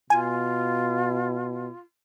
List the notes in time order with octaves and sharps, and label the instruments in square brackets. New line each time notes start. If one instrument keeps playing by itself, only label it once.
[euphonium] B2 [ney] F4 [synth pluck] G#5